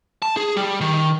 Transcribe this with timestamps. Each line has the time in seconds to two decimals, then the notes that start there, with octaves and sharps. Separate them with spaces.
0.22 A5
0.37 G#4
0.57 G3
0.81 D#3